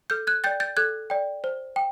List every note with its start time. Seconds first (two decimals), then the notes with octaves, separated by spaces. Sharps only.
0.10 A4 F6 G6
0.27 F#6 G#6
0.44 D5 G5 G6 A6
0.60 G6 A6
0.77 A4 F#6 G#6
1.10 D5 G5
1.44 C5
1.76 G5